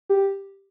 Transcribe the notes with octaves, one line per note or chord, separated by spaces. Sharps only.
G4